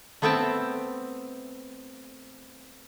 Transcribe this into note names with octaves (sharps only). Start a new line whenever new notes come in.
A3 B3 C4 E5 G5 A5